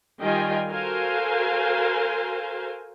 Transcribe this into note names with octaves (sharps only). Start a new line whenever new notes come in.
D#3 G3 F4 D#5 G5 G#5
F#4 A4 A#4 C5 F5 G#5